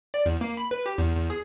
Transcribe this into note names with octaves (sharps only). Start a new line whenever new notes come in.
D5
E2
A#3
B5
B4
G4
E2
E2
G#4